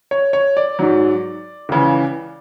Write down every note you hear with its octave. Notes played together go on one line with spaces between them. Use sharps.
C#5
C#5
D5
G#2 F#3
C#2 C#3 E3